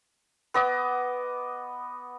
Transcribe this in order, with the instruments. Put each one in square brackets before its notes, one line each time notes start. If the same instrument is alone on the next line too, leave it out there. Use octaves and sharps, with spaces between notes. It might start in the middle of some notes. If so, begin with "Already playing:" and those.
[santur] B3 D#5 D6